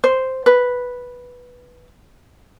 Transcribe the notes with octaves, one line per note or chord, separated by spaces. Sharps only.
C5
B4